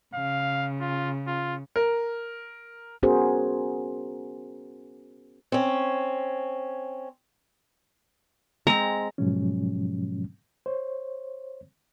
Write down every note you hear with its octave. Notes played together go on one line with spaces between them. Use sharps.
C#3 F5
F4
F4
A#4
B3 C#4 F#4 G#4 A#4 C5
C4 C#4
G#3 C4 A#5
G#2 B2 F3 F#3 G#3 C#4
C5 C#5